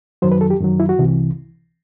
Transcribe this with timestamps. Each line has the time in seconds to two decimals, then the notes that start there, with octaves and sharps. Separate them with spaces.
0.22 F#2 D#3 F#3 C5
0.32 B4
0.41 A4
0.50 G4
0.61 F#2 D#3 F#3
0.80 E4
0.89 F#4
0.99 C2 C3 E3